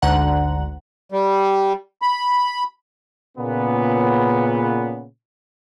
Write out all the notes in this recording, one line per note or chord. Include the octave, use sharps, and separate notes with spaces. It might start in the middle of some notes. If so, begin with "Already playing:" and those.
G#1 D2 D3 F#5 A#5
G3
B5
A#2 C#3 B3